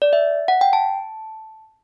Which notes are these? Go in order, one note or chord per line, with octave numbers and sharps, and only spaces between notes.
D5
E5
F#5
G5
A5